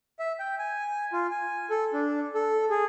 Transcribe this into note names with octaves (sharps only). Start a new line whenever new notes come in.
E5
G5
G#5
F4
G#5
A4
D4
A4
G#4